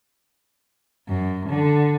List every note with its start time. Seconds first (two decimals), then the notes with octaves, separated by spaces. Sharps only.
1.06 F#2
1.49 D3